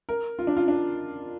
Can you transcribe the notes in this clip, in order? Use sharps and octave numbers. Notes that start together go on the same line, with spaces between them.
A#4
F4
D4
F4
D4